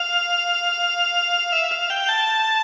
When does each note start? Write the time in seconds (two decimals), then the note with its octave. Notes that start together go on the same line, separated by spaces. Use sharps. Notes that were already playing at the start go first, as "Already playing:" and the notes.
Already playing: F5
1.52 E5
1.71 F5
1.90 G5
2.09 A5